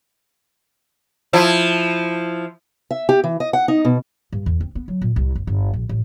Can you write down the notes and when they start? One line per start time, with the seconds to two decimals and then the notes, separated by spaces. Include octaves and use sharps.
1.33 F3 E4
2.91 E5
3.09 G4
3.24 E3
3.40 D#5
3.53 F#5
3.68 D#4
3.85 B2
4.32 G2
4.46 E2
4.61 C4
4.75 B3
4.88 F#3
5.02 A#2
5.16 C2
5.35 F#1
5.47 G1
5.74 A#1
5.89 A1